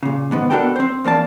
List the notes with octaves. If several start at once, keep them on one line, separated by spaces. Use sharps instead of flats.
A#2 C#3
D#2 G#2 B3
B3 D4 F#4 A4 A#4 G5
C4 C5
E2 A#3 D4 A5